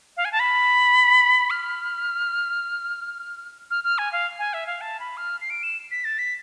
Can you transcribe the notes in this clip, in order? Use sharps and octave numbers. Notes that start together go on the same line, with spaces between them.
F5
G#5
A5
B5
F6
F6
F6
G#5
F5
G#5
E5
F5
A5
B5
F6
C7
D7
E7
B6
A6
B6